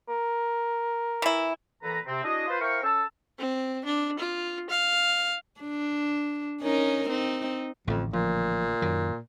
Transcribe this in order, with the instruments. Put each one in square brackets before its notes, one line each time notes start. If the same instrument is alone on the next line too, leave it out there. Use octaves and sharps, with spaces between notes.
[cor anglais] A#4
[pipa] E3 E4
[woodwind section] A#2 E3 A4 B4 A#5
C3 C4
D4 E4 F#4 G#4 D#5
F4 B4 C5
E4 A#4 C5 F5 G5 C#6
C#4 A4 A5 E6
[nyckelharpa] C4
D4
F4
F5
[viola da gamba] D4
C#4 D#4 A#4
C4 D#4
[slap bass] A1 D3 [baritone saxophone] F2 [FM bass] A2
[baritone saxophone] A#2 [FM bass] F3
[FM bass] F#2 [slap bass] D#3